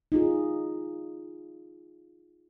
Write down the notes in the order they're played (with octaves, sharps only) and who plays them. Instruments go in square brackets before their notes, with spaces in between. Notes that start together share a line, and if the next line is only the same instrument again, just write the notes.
[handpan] D#4 F4 G#4